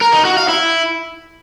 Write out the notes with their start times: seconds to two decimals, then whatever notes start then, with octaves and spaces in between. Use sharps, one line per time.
0.01 A#4
0.13 D#4
0.25 F#4
0.37 F5
0.49 E4